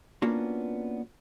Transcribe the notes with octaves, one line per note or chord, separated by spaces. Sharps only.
A#3 B3 C#4 D4 F4 F#4